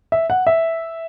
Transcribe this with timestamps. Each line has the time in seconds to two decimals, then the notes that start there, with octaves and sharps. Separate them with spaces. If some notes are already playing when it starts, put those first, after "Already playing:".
0.12 E5
0.30 F#5
0.47 E5